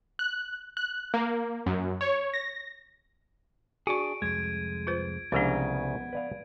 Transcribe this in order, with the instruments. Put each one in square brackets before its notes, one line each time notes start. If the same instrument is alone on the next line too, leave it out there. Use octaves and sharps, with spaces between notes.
[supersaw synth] F#6
F#6
A#3
F#2
C#5
A#6
[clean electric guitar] D4 G#4 [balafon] F#4 C#6 [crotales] D7 D#7
[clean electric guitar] C2 F2 G#3 [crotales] G#6 D7
[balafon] F4 B4 C5
[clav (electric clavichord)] C2 C#3 A#5 [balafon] F3 G#3 D4 [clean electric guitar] B3
[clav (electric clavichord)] B4 D5 F5